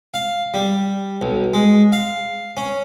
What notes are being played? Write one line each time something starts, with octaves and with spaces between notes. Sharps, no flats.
F5
G3
B1
G#3
F5
C#4